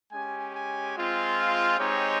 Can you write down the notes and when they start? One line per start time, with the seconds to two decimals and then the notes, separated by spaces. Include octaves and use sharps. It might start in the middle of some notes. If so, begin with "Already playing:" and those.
0.12 G#3 C#4 G4 G#5
0.54 G#5
0.96 G#3 C4 F4
1.37 F5
1.79 G#3 C4 D#4 G4 C#5